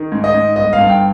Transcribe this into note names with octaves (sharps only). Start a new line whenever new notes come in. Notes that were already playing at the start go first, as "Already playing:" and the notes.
Already playing: D#3
G#2
D#5
G#2
G1 D#5
F5
G2
G5